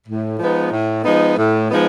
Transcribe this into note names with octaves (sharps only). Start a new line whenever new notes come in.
A2
F3 G#3 B3 D#4
A2
F3 G#3 B3 D#4
A2
F3 G#3 B3 D#4